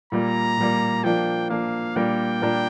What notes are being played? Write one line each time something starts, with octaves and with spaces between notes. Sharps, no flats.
A#2 G3 A#3 A#5
A#2 G3 A#3
F3 A#3 D4 G5
F3 A#3 D4 F5
A#2 G3 A#3 D4 A#4 G5
A#2 G3 A#3 D4 A#4